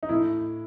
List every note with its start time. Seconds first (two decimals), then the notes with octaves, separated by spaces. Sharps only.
0.03 D#4
0.09 A2 E4